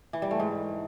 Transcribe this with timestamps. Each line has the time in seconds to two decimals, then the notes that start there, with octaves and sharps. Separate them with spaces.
0.13 E3
0.22 G3
0.31 A3
0.40 G#2